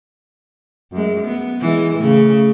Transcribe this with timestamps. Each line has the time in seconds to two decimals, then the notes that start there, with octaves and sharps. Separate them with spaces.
0.92 F#2 G#3
1.27 B3
1.61 E3 G#3
1.95 A2 C#3